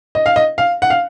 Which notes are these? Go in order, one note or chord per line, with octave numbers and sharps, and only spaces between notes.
D#5
F5
D#5
F5
F#5
F5